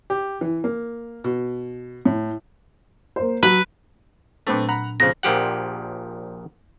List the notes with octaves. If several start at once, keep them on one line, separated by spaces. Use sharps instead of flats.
G4
E3
A#3
B2
A2
A#3 C5
F#3 B4
A#2 F#3 A3 C4 D4 B4
F#5 A#5 B5
F2 C#3 G#4 C5 A#6
A#1 A#2 F3 G4 F#5